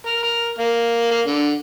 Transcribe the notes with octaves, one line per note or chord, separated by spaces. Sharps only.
A#4
A#4
A#3
A#3
D3